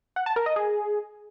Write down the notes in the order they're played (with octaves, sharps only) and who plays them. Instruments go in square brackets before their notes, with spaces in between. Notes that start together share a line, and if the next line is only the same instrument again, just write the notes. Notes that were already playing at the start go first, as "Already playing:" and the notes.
[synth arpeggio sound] F#5
A5
A#4
D#5
G#4